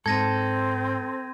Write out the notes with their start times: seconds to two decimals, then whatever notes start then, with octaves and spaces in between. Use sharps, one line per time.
0.06 G#2 C4 A4 G#6 A#6 D#7